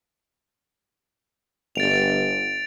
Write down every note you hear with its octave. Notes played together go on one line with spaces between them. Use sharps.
G1 A6 D7 F7